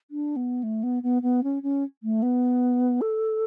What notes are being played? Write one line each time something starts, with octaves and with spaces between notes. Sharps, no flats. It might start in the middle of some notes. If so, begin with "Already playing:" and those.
D4
B3
A3
B3
B3
B3
C#4
C#4
A3
B3
A4